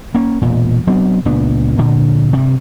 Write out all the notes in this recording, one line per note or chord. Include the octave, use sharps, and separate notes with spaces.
A#3 C#4
E1 A#2
F#3 B3 C4 D4
C#2 A#2 B3 D4
D2 A#2 D3
G2 C3